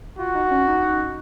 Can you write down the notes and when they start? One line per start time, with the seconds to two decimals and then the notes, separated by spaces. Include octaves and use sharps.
0.19 F4 F#4
0.35 D#4
0.51 C#4
0.67 D#4